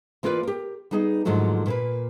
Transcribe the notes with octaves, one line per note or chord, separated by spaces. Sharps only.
E3 A#3 F4 A#4 B4 D5
G4 A#4
G3 B3 D#4 G#4 D#5
G#2 D3 D#3 F3 F#3 A3
A#2 A#3 B4